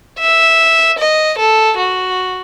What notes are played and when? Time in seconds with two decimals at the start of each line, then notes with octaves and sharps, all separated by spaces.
0.19 E5
0.98 D#5
1.38 A4
1.77 F#4